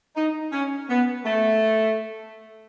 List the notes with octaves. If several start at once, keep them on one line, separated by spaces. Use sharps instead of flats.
D#4
C#4
B3
A3